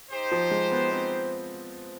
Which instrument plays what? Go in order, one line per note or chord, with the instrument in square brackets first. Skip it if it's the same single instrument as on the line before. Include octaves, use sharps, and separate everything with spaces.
[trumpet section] D#4 G4 C5
[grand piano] F3
G#3
B3
C4